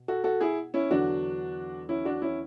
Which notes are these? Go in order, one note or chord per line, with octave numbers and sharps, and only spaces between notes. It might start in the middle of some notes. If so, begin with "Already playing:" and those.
Already playing: B2
F#4 A4
F#4 A4
E4 G#4
C#4 E4
E2 D3 F#3 D4 F#4
C#4 E4
D4 F#4
C#4 E4